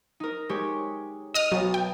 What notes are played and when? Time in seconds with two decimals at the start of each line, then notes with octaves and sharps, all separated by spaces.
0.20 D#4 A#4
0.49 G#3 G4 C#5
1.34 D#5 D#6 F6
1.52 B1 F#3 A5
1.74 G5